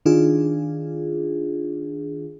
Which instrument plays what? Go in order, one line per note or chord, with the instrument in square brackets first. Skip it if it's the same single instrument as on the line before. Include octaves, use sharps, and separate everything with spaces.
[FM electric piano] D#3 D4 F4 G#4